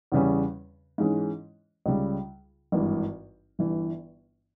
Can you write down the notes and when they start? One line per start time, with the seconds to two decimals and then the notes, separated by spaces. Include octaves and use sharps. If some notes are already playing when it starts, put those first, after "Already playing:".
0.12 E2 C#3 G3 C#4
0.98 G#2 E3 G#3 C#4
1.86 C#2 C#3 G3
2.72 G#1 G2 E3
3.59 G1 G2 E3